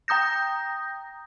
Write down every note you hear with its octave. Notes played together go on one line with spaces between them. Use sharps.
G5 A#5 D#6 G6 A#6